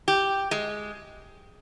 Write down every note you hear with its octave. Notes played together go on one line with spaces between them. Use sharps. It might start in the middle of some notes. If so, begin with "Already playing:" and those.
G4
G#3